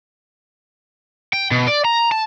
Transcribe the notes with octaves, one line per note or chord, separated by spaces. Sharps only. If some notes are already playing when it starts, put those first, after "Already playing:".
G5
B2
D5
A#5
A5